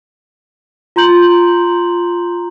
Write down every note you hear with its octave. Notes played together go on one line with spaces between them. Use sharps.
F4 A#5 C6 G6 F#7